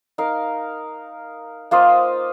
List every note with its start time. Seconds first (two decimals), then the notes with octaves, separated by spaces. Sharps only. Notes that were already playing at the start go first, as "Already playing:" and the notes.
0.18 D#4 A#4 F5
1.71 A#3 F4 C5 D#5